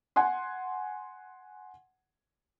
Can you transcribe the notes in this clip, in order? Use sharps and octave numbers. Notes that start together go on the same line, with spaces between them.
F#5 G#5 C6